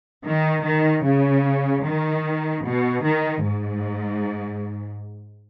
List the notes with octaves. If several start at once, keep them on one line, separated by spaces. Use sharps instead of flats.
D#3
D#3
C#3
D#3
B2
D#3
G#2